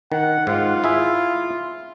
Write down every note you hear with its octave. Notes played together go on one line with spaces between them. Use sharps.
D#3 F#5
G#2 F4
E4 G#4 E5